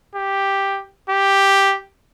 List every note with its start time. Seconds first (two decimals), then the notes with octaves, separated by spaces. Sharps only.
0.15 G4
1.10 G4